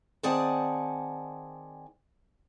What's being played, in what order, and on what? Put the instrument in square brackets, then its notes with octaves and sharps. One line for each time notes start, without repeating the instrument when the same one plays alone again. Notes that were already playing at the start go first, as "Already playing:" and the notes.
[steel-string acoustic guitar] D#3 C4 G#4 D5 F#5 A5